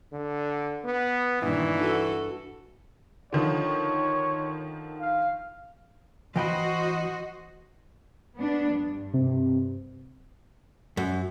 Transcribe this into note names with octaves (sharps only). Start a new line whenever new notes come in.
D3
B3
G2 A#2 D#3 E3
F#4 A4
D3 D#3 F3 C#5
F5
E3 F#4 C5 D#5 G5 B5
B3 D4
G2
C3
F#2